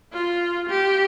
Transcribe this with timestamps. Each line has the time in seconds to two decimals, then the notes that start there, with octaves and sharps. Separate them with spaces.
0.13 F4
0.69 G4